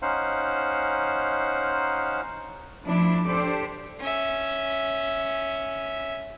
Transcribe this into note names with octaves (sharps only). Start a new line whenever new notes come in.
C#4 D#4 C5 F5 F#5
F3 A3 D4 E4
D4 G4 A4 C5 D5
C#4 E5